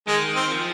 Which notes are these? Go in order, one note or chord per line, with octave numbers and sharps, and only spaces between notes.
D#3 G#3
C4
F3